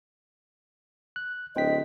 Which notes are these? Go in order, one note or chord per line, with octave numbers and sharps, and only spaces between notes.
F#6
D1 C5 D#5 G5 B6